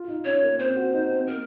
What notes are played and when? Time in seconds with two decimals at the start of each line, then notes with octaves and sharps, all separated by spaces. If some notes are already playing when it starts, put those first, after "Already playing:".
Already playing: F4
0.08 D#4
0.25 C#4 C#5
0.43 A#3
0.59 C4 C5
0.76 F#4
0.93 D#4
1.11 C4
1.27 A#3 A#4